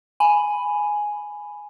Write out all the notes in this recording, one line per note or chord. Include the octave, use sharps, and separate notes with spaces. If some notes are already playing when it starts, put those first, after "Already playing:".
G#5 B5